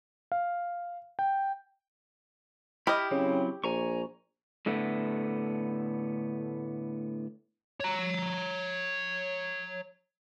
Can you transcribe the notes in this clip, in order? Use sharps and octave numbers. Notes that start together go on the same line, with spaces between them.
F5
G5
E4 G4 D#5 B5 F6
C#3 F#3 C4 E4
A#1 G#5 A#5 C#6
A2 D3 A3 B3
C#5 A#5